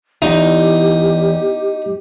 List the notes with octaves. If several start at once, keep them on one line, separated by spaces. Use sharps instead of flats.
E2 D#4 G4